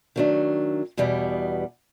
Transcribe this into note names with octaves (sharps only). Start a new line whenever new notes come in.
D#3 F#3 A3 D4
E2 B2 G3 B3